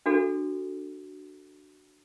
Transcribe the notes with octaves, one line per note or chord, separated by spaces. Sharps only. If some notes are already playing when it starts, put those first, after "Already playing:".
D4 F#4 G#4 A4